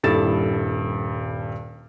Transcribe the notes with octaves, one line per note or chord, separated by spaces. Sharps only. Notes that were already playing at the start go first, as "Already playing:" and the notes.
D#1 G2 E4 A4 A6 E7